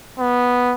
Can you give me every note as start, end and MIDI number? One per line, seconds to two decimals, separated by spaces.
0.19 0.74 59